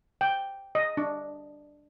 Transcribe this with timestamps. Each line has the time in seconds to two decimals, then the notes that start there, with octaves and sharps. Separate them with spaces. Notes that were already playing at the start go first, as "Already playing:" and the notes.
0.21 G5
0.75 D#5
0.97 D4